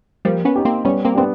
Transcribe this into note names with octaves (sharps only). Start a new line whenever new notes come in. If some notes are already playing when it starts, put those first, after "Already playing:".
F3 G3 A#3
B3 C#4
D#4 G4
A#3 C4
G3 B3 C#4
A#3 C4
B3 C4 D4 G4